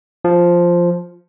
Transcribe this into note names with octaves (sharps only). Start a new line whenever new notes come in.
F3